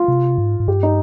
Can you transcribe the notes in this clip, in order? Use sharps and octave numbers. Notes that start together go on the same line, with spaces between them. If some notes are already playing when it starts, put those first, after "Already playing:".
Already playing: F4
C3
G#2
G#2
G2 G4
D#4